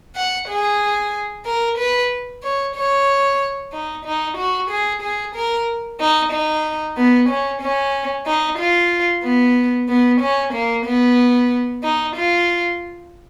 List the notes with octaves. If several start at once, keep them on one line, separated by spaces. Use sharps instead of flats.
F#5
G#4
A#4
B4
C#5
C#5
D#4
D#4
F#4
G#4
G#4
A#4
D#4
D#4
B3
C#4
C#4
D#4
F4
B3
B3
C#4
A#3
B3
D#4
F4